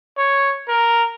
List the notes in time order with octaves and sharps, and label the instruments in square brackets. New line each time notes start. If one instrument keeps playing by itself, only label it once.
[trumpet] C#5
A#4